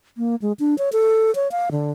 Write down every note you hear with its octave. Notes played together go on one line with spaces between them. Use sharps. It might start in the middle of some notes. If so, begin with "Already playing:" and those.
A#3
G#3
D4
C#5
A4
C#5
F5
D3